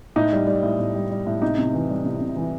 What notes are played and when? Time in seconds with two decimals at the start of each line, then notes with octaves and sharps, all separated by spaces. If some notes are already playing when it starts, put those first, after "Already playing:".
0.16 A2 D#4
0.32 G3
0.47 G3
0.63 A2
0.79 A2
0.94 G3
1.10 G3
1.27 A2
1.42 C3 D#4
1.58 C3
1.74 E3
1.89 G3
2.05 C3
2.21 C3
2.36 E3